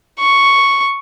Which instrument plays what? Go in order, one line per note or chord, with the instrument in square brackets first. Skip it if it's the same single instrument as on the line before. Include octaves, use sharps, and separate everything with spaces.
[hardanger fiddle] C#6